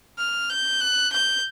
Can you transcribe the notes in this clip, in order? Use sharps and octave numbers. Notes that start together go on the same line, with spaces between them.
F6
G6
F#6
G6